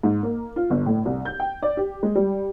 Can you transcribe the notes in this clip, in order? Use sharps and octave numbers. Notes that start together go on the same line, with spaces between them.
G#2
A#3
F4
G1
A2
C2
G6
G5
D5
G4
G#3
G3